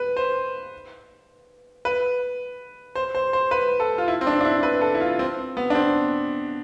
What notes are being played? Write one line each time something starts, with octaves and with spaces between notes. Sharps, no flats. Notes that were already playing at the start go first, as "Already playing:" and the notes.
Already playing: B4
C5
B4
C5
C5
C5
B4
A4
F4
E4
C4
D4
D4
E4
B4
A4
E4
F4
C4
B3
D4
C4